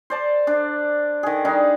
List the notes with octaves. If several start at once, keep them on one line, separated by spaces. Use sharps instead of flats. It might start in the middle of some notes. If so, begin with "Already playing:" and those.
C5 D5 A5
D4
D#3 G#4
G3 D4 D#4 G#4